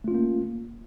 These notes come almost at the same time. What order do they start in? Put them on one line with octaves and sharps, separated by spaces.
A3 F4 C#4 A#3